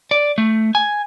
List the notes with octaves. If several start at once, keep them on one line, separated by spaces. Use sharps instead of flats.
D5
A3
G#5